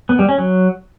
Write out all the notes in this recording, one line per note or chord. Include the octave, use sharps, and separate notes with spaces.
B3
G3
C#4
F#3